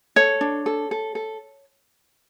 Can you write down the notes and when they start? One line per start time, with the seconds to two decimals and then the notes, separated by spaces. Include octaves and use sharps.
0.16 A4 C#5
0.41 D4
0.66 A4
0.91 A4
1.15 A4